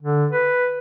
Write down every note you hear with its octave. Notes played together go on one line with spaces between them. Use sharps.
D3
B4